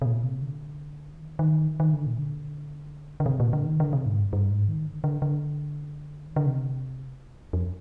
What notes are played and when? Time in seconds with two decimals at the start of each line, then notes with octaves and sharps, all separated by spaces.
0.02 C3
0.06 A#2
0.24 C3
0.42 D3
1.13 D#3
1.39 D#3
1.80 D#3
1.93 D3
2.07 A#2
2.19 D3
3.20 D3
3.26 C3
3.40 A#2
3.53 D3
3.66 D#3
3.80 D3
3.93 C3
4.06 G#2
4.19 G2
4.33 G2
4.50 G#2
4.69 D#3
4.86 D3
5.04 D3
5.22 D3
6.27 D#3
6.36 D3
6.46 C3
7.53 F2